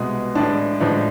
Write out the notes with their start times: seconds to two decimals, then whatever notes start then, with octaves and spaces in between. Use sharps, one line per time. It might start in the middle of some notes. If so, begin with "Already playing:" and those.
Already playing: C2 B2 G#3
0.35 A1 A2 G#3 D4
0.80 A1 A2 F3 G#3 D4